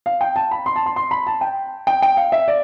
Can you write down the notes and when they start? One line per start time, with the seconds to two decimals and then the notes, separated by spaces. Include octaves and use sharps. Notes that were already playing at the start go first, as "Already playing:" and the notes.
0.06 F5
0.21 G5
0.36 A5
0.51 B5
0.66 C6
0.76 A5
0.86 C6
0.96 C6
1.11 B5
1.27 A5
1.41 G5
1.87 G5
2.02 G5
2.17 F5
2.32 E5
2.48 D5